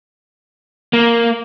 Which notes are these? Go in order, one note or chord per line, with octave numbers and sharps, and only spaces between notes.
A#3